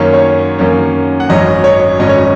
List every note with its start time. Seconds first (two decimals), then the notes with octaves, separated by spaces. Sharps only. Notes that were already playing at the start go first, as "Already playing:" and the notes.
Already playing: F#2 D#3 A#3 C#4 C#5
0.13 C#5
0.59 F#2 D#3 A#3 C#4
1.20 F#5
1.29 G#1 F#2 F#3 C#4 D#5
1.64 C#5
1.99 G#1 F#2 F#3 C#4 D#5
2.09 C#5
2.19 D#5